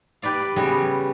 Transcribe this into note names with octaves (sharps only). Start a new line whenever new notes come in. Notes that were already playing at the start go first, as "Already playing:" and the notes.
G4 B4 D5 F5
C#3 G3 B3 F#4